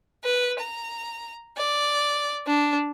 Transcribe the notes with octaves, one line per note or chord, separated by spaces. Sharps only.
B4
A#5
D5
D4